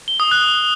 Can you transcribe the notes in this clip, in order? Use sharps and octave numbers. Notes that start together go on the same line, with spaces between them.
G7
D#6
F#6